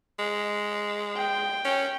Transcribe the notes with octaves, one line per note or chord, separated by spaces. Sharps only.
G#3
G5
C#4